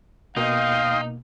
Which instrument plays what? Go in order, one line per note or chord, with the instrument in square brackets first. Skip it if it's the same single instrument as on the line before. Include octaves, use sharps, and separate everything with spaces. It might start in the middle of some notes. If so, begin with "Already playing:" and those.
[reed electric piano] B2 A#3 [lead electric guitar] D#4 [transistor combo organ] D#5 G5 C6 [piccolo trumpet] F5